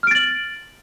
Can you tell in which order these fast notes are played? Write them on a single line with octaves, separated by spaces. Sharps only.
F6 D7 A6 F#7